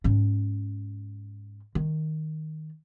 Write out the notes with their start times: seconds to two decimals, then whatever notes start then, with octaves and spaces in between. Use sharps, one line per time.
0.04 G#2 C#4
1.75 D#3